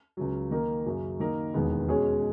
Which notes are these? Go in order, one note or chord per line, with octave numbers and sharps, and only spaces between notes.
C#2 C#3 F#3
D#3 A#3 D#4 A#4
F#2 C#3 F#3
D#3 A#3 D#4 A#4 D#5
E1 D#2 D#3 G#3 B3
B2 G#3 C#4 G#4 C#5